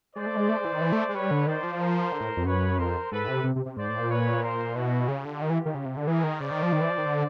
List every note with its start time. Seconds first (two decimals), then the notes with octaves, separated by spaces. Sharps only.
0.15 G#3 C5 D5
0.26 A3
0.37 G#3
0.49 A3
0.57 G#3
0.65 E3
0.73 D#3
0.81 E3
0.92 A3
1.09 G#3
1.14 G3 B4 C#5
1.31 D3
1.46 D#3 C5 D5
1.64 F3
1.79 A#4 C5
2.12 D3
2.21 A2
2.37 F2
2.45 F#2 B4 C#5
2.78 F2 A#4 C5
3.11 G#2 A4 B4
3.28 C3
3.44 C3
3.56 C3
3.66 C3
3.77 G#2 C5 D5
3.89 A2
3.99 A#2
4.10 B4 C#5
4.43 A#4 C5
4.75 B2 E4 F#4
5.08 C#3 F4 G4
5.25 D3
5.42 D#3
5.50 E3
5.66 D#3
5.75 C#3
5.85 C3
5.97 D3
6.07 E3 G#4 A#4
6.24 D#3
6.40 C#3 C5 D5
6.51 D#3
6.63 F3
6.73 D#3
6.81 E3
6.90 F3
6.98 D#3
7.06 D3